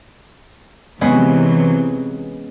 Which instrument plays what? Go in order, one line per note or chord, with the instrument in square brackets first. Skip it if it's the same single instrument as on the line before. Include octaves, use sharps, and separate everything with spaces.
[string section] C3 E3 F#3 [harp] G#3 B3 C#4